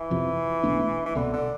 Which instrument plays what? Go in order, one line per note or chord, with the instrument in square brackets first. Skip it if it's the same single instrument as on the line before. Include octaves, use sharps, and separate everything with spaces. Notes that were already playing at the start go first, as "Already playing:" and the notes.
Already playing: [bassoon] E3
[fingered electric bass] F2 C3 F3
B1 B2 A3 D4
[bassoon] E3
[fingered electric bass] C2 B2 B3 [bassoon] D3
[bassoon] D3